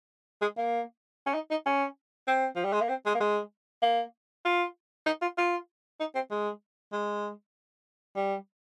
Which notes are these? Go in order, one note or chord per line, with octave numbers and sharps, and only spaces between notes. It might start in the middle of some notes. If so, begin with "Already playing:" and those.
G#3
A#3
C#4
D#4
D#4
C#4
C4
F3
G3
G#3
A#3
C4
G#3
A#3
G#3
A#3
F4
D#4
F4
F4
D#4
C4
G#3
G#3
G3